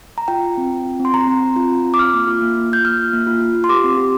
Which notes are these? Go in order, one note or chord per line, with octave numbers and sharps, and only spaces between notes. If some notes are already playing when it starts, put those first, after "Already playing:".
A#5
F4 G5
F4
C4
C4
F4
C4
C6
C4 A#5
C4
C4
F4
C4
F4
D6
F4 F6
A#3
F4
A#3
F4
F4 G6
A#3 F6
F4
A#3
F4
F4
F4
C6
G4 D6
C4
G4